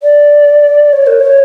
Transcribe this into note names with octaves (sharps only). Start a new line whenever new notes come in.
D5
C#5
A#4
C#5